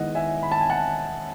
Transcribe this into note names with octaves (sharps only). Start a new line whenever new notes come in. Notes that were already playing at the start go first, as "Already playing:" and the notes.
Already playing: D#3 G#3 B3 E4 D#5 F#5
E5 G#5
B5
A5
G#5
F#5 A5